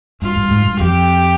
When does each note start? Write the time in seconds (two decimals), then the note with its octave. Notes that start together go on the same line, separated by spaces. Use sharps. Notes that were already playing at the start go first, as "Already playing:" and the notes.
0.22 G2 F4
0.36 G2
0.51 G#2
0.66 G2
0.81 F2 G4